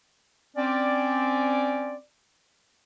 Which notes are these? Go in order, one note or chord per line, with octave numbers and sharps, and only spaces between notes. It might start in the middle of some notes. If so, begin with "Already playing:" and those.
C4 C#4 D5